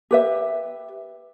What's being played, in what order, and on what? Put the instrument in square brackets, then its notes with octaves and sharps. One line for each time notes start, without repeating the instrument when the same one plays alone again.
[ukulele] G4 B4 E5